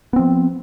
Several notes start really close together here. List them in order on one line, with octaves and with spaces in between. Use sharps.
B3 C4 F3